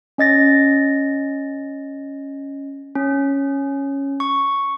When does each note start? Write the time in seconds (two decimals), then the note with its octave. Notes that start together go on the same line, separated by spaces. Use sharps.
0.18 C#4 D#5 A6 A#6
2.95 C#4
4.20 C#6